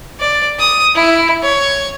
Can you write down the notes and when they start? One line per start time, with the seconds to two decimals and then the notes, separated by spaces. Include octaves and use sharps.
0.20 D5
0.59 D#6
0.95 E4
1.42 C#5